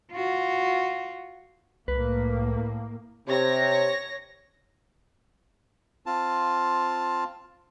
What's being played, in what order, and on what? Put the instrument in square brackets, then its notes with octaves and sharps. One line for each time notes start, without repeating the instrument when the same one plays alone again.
[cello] F4 F#4
[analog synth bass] C2 [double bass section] A2 A#3 [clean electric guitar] B4
[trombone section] C3 [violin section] C#5 A#6
[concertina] C4 F4 A5